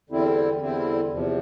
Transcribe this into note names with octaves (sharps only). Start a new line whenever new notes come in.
E2 D3 G3 C4 E4
E2 D3 G3 C4 E4
E2 C3 F3